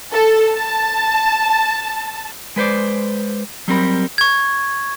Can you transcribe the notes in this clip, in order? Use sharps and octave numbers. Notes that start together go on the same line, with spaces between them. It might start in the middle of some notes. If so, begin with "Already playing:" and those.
A4
A5
G#3 B4 C5 D5
F#3 G3 C4 A#4 B5
C#6 G#6